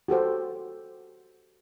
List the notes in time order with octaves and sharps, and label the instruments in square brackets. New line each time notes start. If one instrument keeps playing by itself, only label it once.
[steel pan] F#4 G4 A4 C5